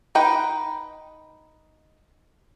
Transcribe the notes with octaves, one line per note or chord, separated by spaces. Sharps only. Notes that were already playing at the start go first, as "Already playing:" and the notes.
D#4 B4 G5